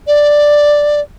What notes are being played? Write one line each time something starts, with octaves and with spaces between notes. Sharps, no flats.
D5